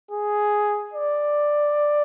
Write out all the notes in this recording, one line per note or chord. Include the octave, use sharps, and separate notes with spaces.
G#4
D5